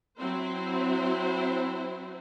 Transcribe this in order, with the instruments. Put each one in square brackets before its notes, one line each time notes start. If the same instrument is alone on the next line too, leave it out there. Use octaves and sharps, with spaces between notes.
[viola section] F#3 C4 E4 C5